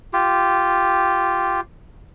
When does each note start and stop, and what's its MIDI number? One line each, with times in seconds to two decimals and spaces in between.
0.13 1.60 65
0.13 1.60 67